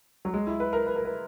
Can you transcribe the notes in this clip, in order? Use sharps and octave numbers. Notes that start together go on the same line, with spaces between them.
F#3
G#3
E4
B4
A#4
B4
A#4
B4